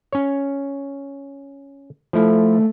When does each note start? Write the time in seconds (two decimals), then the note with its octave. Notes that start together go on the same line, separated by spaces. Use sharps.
0.12 C#4 C#5
2.13 F3 A3 E4